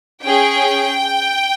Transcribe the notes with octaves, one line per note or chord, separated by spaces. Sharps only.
C#4 G#4 G5